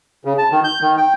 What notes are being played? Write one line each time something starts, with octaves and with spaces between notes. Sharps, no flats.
C#3
A5
D#3
G6
D#3
G5